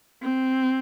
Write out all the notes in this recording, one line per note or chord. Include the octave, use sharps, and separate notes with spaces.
C4